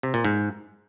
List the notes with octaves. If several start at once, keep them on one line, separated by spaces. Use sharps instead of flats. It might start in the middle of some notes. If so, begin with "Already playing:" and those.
C3
A#2
G#2